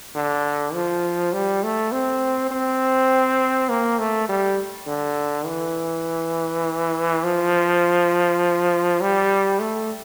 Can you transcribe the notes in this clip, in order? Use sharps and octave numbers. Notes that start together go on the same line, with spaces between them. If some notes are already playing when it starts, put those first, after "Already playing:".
D3
F3
G3
A3
C4
C4
A#3
A3
G3
D3
E3
F3
G3
A3